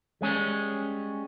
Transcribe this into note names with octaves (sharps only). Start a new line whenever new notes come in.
G3 G#3 C#4